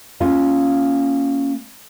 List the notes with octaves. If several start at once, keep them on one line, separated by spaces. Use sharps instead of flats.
A#3 C#4 F4 G#5